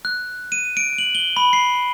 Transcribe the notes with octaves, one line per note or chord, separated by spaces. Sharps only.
F#6
D#7
D7
F#7
G7
B5
C7